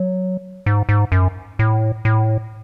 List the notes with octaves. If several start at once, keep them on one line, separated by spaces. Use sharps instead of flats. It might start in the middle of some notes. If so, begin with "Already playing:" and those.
Already playing: F#3
G#2
G#2
F#2
A2
A2